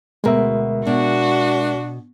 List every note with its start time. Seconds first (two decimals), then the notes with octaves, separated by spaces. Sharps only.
0.24 D2 B2 G#3 A#4 E5
0.87 B2 D4 F#4